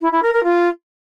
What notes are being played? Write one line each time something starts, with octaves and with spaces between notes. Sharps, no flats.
E4
E4
A#4
A#4
F4